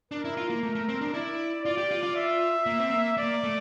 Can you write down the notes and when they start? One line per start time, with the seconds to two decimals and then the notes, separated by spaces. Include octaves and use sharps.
0.12 D4 A#4
0.25 E4
0.37 F4
0.50 A#3
0.63 A3
0.75 A3
0.89 C4
1.01 D4
1.14 E4 D5
1.65 F4 D5
1.78 G4
1.91 F4
2.03 F4
2.16 E5
2.66 A#3
2.78 C4
2.90 A#3
3.17 A#3 D5
3.44 A3